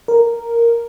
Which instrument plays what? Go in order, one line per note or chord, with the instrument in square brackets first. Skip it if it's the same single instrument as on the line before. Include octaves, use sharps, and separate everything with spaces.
[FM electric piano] A#4